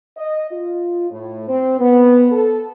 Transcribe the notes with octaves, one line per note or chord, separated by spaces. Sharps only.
D#5
F4
A2
C4
B3
A4